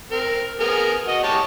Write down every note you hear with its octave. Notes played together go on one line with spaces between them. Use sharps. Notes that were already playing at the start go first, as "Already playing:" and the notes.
C4 A#4
B3 G#4 A#4
F#4 D#5
G4 C#5 A5